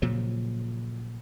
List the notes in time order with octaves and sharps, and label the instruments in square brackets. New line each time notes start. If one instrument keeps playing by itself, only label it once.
[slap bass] A#2 C#3 F3 F#3